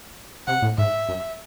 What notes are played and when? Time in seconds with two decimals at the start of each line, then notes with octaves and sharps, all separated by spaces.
0.47 C3 F#5
0.62 A2
0.78 G#2 E5
1.09 F#2